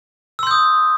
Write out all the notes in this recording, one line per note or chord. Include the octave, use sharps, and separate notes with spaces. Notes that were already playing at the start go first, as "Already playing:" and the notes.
C6 D#6 E6 G6